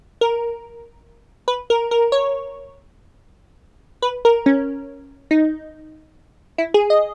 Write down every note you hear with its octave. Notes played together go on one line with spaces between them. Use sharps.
A#4
B4
A#4
A#4
C#5
B4
A#4
C#4
D#4
E4
G#4
D#5